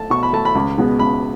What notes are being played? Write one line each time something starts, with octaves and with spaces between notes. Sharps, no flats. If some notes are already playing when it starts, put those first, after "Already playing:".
Already playing: A3 A5
B2 C#6
B5
A3 A5
B5
C#2
B2 G#3 B3
C#2 B5